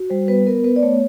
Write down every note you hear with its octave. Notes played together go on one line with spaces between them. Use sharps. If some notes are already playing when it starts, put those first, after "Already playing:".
Already playing: F#4
G3 C5
B3 B4
B3 A#4
B3 B4
D5
A3 C#5